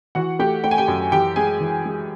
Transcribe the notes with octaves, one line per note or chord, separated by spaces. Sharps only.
E3 F#4 F#5
A3 G4 G5
A3 G5
G#5
G4 G5
F#2
E3 G4 G5
G#3 G#4 G#5
E3
G#3